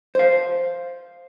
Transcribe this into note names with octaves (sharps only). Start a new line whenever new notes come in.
C5 F5